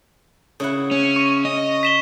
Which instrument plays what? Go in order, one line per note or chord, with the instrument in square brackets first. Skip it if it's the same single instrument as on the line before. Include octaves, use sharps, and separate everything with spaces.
[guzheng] C#3 E4 F#5
[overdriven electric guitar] C#4
[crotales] C#6 D#7
[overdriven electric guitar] D#5
[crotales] B6 E7 G7